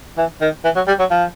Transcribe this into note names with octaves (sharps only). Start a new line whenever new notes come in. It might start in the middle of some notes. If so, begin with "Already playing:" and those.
E3
D#3
E3
F#3
G3
F#3
F3